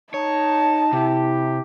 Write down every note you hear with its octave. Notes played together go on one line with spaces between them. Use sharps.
D#4 C#5 A5
C3 E4 G4